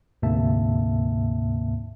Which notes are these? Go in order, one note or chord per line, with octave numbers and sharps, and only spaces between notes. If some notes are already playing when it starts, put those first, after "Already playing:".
D2 G#2 C3 A#3 E5 A5